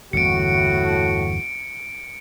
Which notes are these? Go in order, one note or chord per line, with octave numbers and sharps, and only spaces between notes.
G1 E2 A2 D3 F#4 C#7 D7